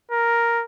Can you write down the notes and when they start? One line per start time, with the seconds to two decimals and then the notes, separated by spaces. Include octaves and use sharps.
0.12 A#4